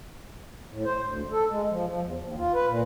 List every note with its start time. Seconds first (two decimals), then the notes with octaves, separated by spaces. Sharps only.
0.71 A2
0.85 C5
1.04 D2
1.31 A4
1.49 G#3
1.70 F3
1.87 F3
2.02 E2
2.21 D#2
2.37 F4
2.53 B4
2.67 A#2